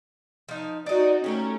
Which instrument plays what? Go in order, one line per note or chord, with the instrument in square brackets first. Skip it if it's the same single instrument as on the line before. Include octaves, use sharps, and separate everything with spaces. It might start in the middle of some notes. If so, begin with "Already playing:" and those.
[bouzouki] F3 D#4
[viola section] D#4 F#4 [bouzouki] D5 D#5
[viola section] A3 C#4 [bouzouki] G4 G#4 A#4